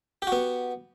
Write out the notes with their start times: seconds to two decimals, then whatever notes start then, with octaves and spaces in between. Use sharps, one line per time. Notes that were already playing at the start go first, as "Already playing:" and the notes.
0.22 G4
0.27 F#4
0.32 B3